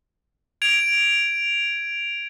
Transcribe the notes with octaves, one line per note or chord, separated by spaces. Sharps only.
G#6 D7 F7